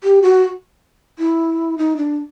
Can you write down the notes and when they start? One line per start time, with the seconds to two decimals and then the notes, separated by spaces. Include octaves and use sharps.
0.04 G4
0.22 F#4
1.19 E4
1.78 D#4
1.97 D4